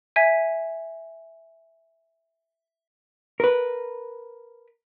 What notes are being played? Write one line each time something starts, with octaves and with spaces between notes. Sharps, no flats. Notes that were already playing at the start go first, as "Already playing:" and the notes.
E5 G#5 G#6 B6 D#7
A#4 B4